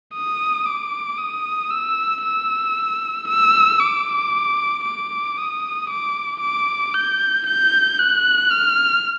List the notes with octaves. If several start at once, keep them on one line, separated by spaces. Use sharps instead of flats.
D#6
D6
D#6
E6
E6
E6
D6
D6
D#6
D6
D6
G6
G6
F#6
F6